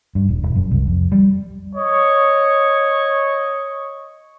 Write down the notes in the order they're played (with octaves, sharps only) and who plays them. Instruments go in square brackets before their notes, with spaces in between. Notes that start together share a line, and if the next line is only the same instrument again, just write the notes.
[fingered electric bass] G2
D#1
E1
F#2
C2
F2
G3
[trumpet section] C#5 D#5 C#6